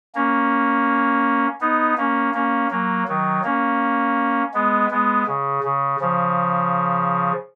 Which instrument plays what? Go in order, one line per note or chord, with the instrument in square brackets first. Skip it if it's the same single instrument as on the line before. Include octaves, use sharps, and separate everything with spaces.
[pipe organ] A#3 C#4
B3 D#4
A#3 C#4
A#3 C#4
F#3 A#3
D#3 F#3
A#3 C#4
G#3 B3
G#3 B3
C#3
C#3
C#3 F3